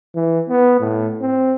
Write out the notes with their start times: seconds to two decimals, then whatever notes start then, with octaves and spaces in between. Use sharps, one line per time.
0.15 E3
0.49 B3
0.80 A2
1.21 C4